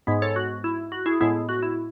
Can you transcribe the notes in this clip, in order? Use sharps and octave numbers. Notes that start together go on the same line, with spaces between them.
G#2 G#3 B3
A4 C#5
F#4
E4
F#4
E4 G#4
A2 G#3 B3 E4 G#4
F#4
E4